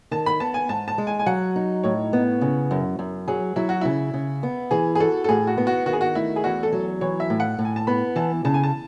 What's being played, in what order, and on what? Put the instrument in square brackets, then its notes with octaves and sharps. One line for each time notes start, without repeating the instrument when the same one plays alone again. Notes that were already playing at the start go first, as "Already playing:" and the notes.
[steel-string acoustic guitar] D#3 [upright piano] A5
[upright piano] B5
[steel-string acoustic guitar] B3 [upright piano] A5
[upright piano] G#5
[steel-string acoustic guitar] G#2 [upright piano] A5
[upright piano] A5
[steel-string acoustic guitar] G#3
[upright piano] G#5
G#5
[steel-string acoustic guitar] F#3 [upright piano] F#5
[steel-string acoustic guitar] D#4
[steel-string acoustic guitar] A2 [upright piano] C#5
[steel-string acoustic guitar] B3
C#3
F#2
F#2
[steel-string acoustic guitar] F#3 [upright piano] G#4
[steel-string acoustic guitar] F#3 [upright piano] E4
[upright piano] F#4
[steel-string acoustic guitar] C#3 [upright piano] E4
[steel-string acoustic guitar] C#3
B3
[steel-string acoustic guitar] E3 [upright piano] G#4
[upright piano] G#4
[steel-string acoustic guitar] F#4 [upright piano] A4
[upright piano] A4
[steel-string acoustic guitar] A2 [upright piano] G#4
[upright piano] F#4
[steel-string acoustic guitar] B3
[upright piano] F#4
[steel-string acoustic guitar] D#3 [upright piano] F#4
[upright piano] G#4
F#4
[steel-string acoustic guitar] A3 [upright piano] E4
[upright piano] G#4
[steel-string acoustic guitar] E2 [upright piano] F#4
[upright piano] A4
[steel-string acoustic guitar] F#3
[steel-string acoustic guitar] E3 [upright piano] C#5
[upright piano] E5
[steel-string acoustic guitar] A2
[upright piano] F#5
[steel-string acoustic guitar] A2
[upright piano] G#5
A5
[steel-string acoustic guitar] B3 [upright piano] B5
[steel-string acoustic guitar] E3 [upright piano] A5
[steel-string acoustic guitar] C#3 [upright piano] A5
[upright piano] G#5
A5